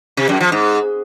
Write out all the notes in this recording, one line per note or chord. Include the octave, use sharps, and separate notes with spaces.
C3
F#2
F3
G#2